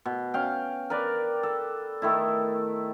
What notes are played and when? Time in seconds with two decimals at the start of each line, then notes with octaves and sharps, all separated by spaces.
0.05 B2
0.34 C#4 F5 G5
0.90 A#4 B4 D5
1.43 A4
2.02 D#3 A3 E4